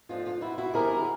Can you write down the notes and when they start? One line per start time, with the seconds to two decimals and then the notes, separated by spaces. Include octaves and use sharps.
0.09 G#2 F3 A3 D4 F4
0.26 F4
0.41 E4 F#4
0.58 E4 F#4
0.74 D3 G3 C4 E4 G#4 A#4